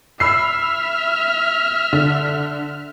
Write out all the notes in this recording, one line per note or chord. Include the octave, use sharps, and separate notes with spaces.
E5 B5 E6 F6 C7
D3